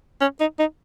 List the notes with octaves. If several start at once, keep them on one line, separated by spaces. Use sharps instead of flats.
C#4
D#4
D#4